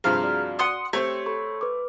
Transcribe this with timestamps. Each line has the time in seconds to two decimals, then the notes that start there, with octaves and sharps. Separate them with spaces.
0.04 G2 C3 F3 G#4 F5 A#5 F6
0.24 F#4 D5
0.59 F#5 C6 D#6
0.93 A3 C4 G4 C5 C#5
1.26 A4 B5 C#6
1.61 B4 D6